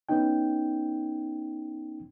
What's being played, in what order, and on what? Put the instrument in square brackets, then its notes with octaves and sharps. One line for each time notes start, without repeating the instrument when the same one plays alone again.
[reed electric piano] B3 C#4 D#4 G5